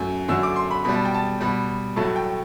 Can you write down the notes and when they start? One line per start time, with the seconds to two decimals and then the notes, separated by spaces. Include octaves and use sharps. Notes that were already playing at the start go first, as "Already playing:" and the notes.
Already playing: F#2 F#3 A3
0.28 F#2 D3 F#3 A3 E6
0.43 D6
0.56 C6
0.71 B5
0.84 B2 G3 B5
0.94 A5
1.05 G5
1.14 A5
1.40 B2 G3 B5
1.96 A2 F#3 A3 A5
2.16 G5